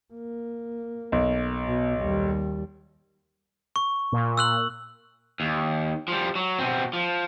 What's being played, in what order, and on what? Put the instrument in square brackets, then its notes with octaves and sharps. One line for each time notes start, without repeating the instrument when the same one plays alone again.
[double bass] A#3
[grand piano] B1
[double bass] B2
D#2 G3
[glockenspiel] C#6
[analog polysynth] A#2
[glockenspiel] E6 F#6 F#7
[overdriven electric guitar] D#2
F3 G3
F#3
B2 C4
F3